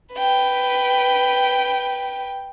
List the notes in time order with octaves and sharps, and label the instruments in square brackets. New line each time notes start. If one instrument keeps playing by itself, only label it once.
[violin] B4 G5